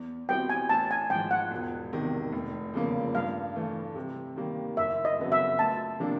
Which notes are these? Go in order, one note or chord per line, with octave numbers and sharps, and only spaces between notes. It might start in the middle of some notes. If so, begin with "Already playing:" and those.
Already playing: E2
B2 G3 C4 E4 G5
G#5
A1 A5
G#5
G#2 F3 G5
F#5
E1
E2 C3 D#3
F1
E2 C#3 F3 A#3
G2 F5
E3 A3
C3
D#3 G3 A#3
F#1 E5
D#5
F2 C#3 F#3 B3
E5
D2 A5
C3 F3 A#3 D4